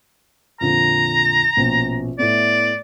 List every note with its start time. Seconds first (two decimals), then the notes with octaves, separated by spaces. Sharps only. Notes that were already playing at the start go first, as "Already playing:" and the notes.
0.61 F2 A#2 D3 A#5
1.57 A#1 B2 C#4
2.19 A2 A3 B3 D5